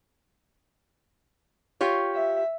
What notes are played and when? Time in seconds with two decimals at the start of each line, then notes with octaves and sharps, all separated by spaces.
1.81 F4 G4 C#5
2.15 E5